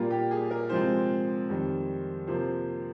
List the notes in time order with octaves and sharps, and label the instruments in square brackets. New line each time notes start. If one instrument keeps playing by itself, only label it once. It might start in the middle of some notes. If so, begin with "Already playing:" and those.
Already playing: [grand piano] A#2 G3 A#3 F4
G4
G#4
A#4
C3 F3 G#3 C4 C5
F2 D#3 G3
C3 F3 A#3 C5